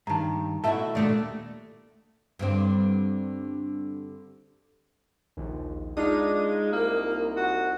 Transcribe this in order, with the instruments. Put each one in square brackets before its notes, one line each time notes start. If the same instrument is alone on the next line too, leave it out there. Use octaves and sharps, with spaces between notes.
[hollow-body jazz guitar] G2 D#3 [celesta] A5 A#5
[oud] B2 E5 [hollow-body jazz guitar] A3 E4 F#4 [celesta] A5
[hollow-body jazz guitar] D#2 A#2 [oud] A3 D4
[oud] G2 D3 C4
[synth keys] A#1 D#2
[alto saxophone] G#3 [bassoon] D4 [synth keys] D#4 F4 D#6
[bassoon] C2 [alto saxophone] A#3
[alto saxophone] F#4